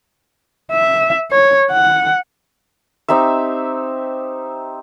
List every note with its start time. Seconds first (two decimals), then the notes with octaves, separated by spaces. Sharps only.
0.72 E5
1.31 C#5
1.71 F#5
3.08 C4 D#4 G4 E5